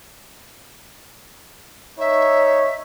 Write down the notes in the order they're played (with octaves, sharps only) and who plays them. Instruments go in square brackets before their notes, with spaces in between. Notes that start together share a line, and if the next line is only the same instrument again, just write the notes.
[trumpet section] D#4 C#5 [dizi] E5